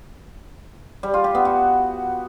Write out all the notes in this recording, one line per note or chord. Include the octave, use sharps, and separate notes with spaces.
G3
F4
G4
B3
F#4